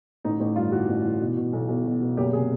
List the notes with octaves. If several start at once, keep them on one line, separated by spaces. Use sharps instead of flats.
A1 D#4
A1
G2 F4
E3 F#4
A1
E3
B2
B2
B1
B1
B2
B2
F#1 G4
C3 G#4